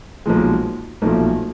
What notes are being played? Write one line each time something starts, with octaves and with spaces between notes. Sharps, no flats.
B1 A#2 F3 G#3
B1 A#2 F3 A3